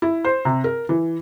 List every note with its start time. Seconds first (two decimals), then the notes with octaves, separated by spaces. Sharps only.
0.02 E4
0.25 C5
0.45 C3
0.64 A#4
0.89 E3